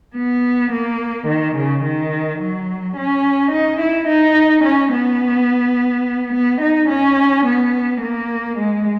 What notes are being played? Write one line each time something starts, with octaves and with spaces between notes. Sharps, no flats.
B3
A#3
D#3
C#3
D#3
F#3
C#4
D#4
E4
D#4
C#4
B3
B3
D#4
C#4
B3
A#3
G#3